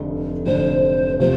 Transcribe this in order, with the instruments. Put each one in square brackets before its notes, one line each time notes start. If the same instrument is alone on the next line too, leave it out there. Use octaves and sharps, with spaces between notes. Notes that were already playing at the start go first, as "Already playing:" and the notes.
Already playing: [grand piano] F1 F2 D3
[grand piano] F1 F2 D3 [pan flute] C5
[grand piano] C3 F3 A3 [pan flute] C5